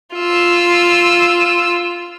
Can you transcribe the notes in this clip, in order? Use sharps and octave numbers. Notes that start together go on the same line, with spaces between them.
F4 E6